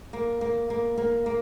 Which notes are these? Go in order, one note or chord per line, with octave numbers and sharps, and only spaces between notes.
A#3
A#3
A#3
A#3
A#3